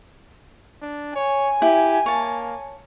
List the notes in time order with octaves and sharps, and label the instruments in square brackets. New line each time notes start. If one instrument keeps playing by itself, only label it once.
[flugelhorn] D4
[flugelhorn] C#5 [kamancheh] G#5
[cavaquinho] E4 [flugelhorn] G4
[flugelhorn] A#3 [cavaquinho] C#5 A5